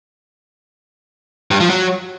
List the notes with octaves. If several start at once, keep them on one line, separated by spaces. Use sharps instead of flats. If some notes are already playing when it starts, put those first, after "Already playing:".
G2
F3
F#3